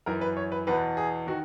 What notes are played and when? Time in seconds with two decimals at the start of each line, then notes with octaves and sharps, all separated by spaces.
0.06 F#2 E3 A#4
0.21 B4
0.37 C#5
0.52 B4
0.67 E2 B2 B4
0.97 G#4
1.27 D#3 F#4